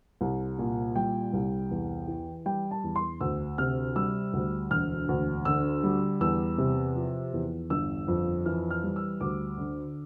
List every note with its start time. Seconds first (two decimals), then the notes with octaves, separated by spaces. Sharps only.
0.21 C2
0.58 A#2
0.96 G3 G5
1.33 C2
1.71 E2
2.08 E3
2.45 G3 G5
2.71 A5
2.84 E2
2.96 C6
3.21 D2 E6
3.58 C3 F6
3.96 G3 E6
4.33 D2
4.71 E1 F6
5.08 D2
5.45 D3 E6
5.83 G3
6.21 E2 E6
6.58 C3
6.96 F3
7.33 E2
7.70 G1 E6
8.08 F2
8.46 E3 F6
8.71 F6
8.83 G3
8.96 E6
9.21 D2 D6
9.58 D3